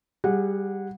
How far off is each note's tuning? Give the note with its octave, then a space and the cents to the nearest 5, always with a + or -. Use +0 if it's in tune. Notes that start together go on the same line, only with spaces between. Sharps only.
G3 +0 G#4 -20 F#5 -15